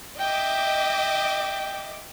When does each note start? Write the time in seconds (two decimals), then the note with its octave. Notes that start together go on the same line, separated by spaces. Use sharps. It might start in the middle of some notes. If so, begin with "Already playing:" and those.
0.19 D#5 E5 G5 D6